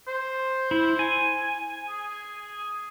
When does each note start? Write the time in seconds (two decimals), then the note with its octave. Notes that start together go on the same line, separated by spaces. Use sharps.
0.08 C5
0.71 E4
0.99 G#5
1.89 G#4